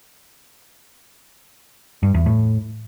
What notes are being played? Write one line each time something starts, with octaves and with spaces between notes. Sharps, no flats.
G2
E2
A2